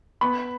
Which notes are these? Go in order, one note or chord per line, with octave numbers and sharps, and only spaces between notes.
B3 B5